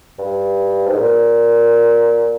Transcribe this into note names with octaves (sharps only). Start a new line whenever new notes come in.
G2
G#2
A#2